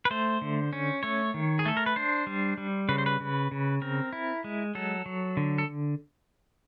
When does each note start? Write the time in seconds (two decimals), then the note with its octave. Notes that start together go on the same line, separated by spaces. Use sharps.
0.05 B4
0.11 A3 C5
0.42 D3
0.73 C#4
1.03 A3 C#5
1.34 D#3
1.59 G#4
1.66 A3 A4
1.77 A#4
1.86 B4
1.96 D4 C5
2.27 G3
2.57 G3
2.89 C#3 B4
2.98 C5
3.06 B4
3.20 C#3
3.52 C#3
3.82 C4 A#4
4.13 E4
4.44 G#3
4.75 F#3 A4
5.06 F#3
5.37 D3
5.58 A4